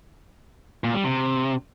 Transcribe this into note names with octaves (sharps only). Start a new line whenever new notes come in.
A#2
G3
C3